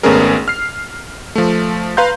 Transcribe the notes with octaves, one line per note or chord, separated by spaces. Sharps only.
G#1 A3 B3 C#4 G#4 A#4
F6 C7
F3 A3
B4 F5 A#5 C6 G6